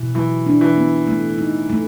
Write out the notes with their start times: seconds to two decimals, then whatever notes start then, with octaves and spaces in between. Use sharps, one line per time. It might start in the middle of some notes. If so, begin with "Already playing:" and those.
Already playing: B2 E3
0.15 E3 F#3
0.46 D4
0.61 E3
0.77 B3
1.07 A3
1.38 D#4
1.70 A3